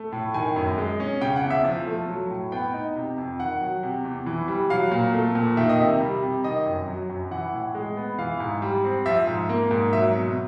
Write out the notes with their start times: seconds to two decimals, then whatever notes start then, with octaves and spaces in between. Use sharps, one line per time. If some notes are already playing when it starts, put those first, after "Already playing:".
Already playing: A3
0.12 A2
0.34 D#3 G#5
0.56 F#2
0.78 G#3
1.00 C#4
1.21 C#3 G5
1.36 F#5
1.43 E2
1.50 E5
1.65 F3
1.87 A3
2.08 F#3
2.31 A2
2.52 B3 G5
2.73 D#4
2.96 C3
3.18 F2
3.39 D#3 F#5
3.61 F#3
3.83 C3
4.05 E2
4.26 E3
4.48 G3
4.70 F#3 F5
4.92 A#2
5.14 A3
5.35 A#2
5.57 D#3 E5
5.69 D#5
5.78 C3 E5
6.01 G3
6.22 C3
6.44 D#3 D#5
6.66 F#2
6.88 F#3
7.09 F#2
7.31 E3 F#5
7.53 A2
7.75 G#3
7.97 B3
8.18 E3 F5
8.40 G#2
8.62 G3
8.84 C4
9.06 F3 E5
9.27 G#2
9.49 A#3
9.71 G#2
9.93 F#3 E5
10.15 B2